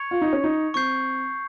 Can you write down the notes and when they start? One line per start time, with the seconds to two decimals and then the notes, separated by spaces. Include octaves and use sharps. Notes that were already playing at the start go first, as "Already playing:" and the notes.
Already playing: C#6 G#6 C#7 F7
0.11 F4
0.22 D#4
0.33 C#4
0.44 D#4
0.74 C4 C#6 G6 C7